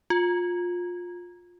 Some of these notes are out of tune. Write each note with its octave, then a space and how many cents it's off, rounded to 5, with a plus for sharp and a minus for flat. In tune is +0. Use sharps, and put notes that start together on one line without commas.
F4 +20